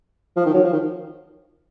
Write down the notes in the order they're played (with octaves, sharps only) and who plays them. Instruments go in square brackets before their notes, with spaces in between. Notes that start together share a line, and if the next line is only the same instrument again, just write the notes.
[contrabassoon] F3
D#3
F#3
F3
D#3